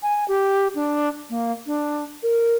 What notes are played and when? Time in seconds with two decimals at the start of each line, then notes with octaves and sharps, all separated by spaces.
0.03 G#5
0.28 G4
0.75 D4
1.30 A#3
1.66 D4
2.23 A#4